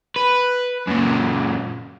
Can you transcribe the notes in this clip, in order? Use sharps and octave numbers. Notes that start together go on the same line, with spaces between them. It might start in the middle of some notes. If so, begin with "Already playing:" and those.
B4
F#2 A#2